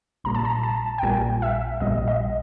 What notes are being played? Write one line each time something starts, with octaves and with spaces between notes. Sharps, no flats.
A#1 A#2 G3 A#5
A5
A#5
A5
G5
A#1 A#2 G3 G#5
E5
A#1 A#2 G3 D#5
D#5